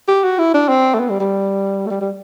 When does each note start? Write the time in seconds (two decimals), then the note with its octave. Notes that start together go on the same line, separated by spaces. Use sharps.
0.08 G4
0.24 F#4
0.39 E4
0.54 D4
0.69 C4
0.94 A3
1.00 B3
1.10 G3
1.20 G3
1.86 A3
1.90 G3
2.01 G3